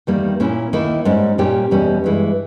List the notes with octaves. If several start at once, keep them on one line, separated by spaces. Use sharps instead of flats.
E2 D#3 G3 A#3
A#2 A#3 C#4 E4
D#2 D#3 A#3 E4
G#2 G3 C#4
A#2 G3 C#4 G4
E2 B2 G3 C#4
G2 E3 G#3